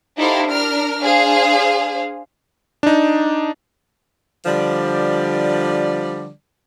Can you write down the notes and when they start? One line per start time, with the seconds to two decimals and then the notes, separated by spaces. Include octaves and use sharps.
0.18 D#4 E4 G4 A4 C5 F5
0.47 D4 A#4 F6
1.01 D4 G#4 C5 F5
2.83 D4 D#4
4.46 D3 F3 G3 D5